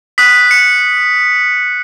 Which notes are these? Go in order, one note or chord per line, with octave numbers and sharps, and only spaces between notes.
D#6 F#6 B6
C#7